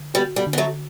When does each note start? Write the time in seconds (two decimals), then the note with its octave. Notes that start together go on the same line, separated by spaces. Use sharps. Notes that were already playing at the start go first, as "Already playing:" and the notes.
Already playing: D3
0.14 G3 B3 F#4
0.36 G3 B3
0.47 D3
0.53 B3
0.58 F#3 A3